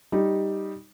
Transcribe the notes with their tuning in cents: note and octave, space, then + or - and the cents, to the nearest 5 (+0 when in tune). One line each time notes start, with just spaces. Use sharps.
G3 +0 D#4 +0